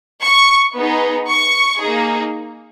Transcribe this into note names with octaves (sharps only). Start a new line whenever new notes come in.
C#6
B3 D#4 G#4
C#6
A#3 D#4 G#4